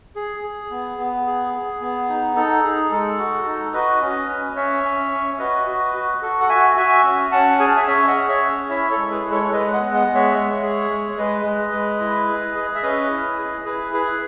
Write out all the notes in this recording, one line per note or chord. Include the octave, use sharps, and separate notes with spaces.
G#4
G#4
B3
B3
G#4
G#4
B3
D#4
D#4 A4
D#4 G#4
G#3 A4
F#4
D#4
F#4 B4 D#5
C#4
C#4
C#4 C#5 E5
C#4
C#4
F#4 B4 D#5
F#4
F#4
F#4 A4
F#5
F#4 E5 G#5
F#4 E5 G#5
C#4
C#4 F#5 A5
G#4 G#5
A5
E5 G#5
C#4 C#5 E5
D#5 F#5
G#4
C#5 E5
C#4
E4 C#5 E5
A4 C#5
G#3
G#4 B4
G#3
A4 C#5
C#5
G#3 B4 D#5
D#5 F#5
B3
D#5 F#5
G#3
C#5 E5
G#3
G#4
G#3
G#3 B4 D#5
G#3
G#3
E4
G#4
G#4
E5
C#4 B4 D#5
E4
G#4
E4 G#4 B4
G#4 B4